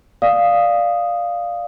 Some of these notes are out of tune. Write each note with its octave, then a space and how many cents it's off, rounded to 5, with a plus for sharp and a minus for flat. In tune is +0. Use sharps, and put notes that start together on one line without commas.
D5 +0 F5 +0 D#6 +0